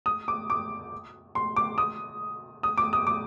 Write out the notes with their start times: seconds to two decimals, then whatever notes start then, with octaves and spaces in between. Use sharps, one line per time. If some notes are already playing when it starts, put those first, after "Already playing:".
0.06 D#6
0.28 D6
0.50 D6
1.35 C6
1.56 D6
1.78 D#6
2.63 D#6
2.78 D6
2.93 D#6
3.07 D6